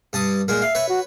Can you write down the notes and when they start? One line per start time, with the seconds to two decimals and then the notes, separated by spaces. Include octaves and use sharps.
0.13 G2 A5 D#6
0.48 A#2 G#3 A#4
0.62 E5 F5
0.75 B4 C#5
0.89 F#4